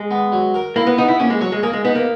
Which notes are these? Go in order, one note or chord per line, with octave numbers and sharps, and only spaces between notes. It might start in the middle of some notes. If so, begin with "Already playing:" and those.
Already playing: G#3
B3
F#3
A#4
A#3 E4
B3
B3 D#4
E4
A#3 C#4
G#3
F#3 C#5
G#3
A#3 G#4
G#3
B3 D#4
A#3